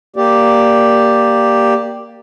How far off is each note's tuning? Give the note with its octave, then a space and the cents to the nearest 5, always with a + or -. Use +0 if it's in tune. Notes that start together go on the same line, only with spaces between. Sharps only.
A#3 +0 G4 +0 D5 +0